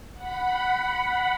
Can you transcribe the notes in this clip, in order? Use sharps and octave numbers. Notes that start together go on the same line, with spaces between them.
F#5 B5